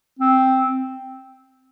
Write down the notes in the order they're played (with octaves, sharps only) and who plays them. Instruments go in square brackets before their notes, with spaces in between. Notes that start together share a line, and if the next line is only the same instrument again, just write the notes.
[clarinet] C4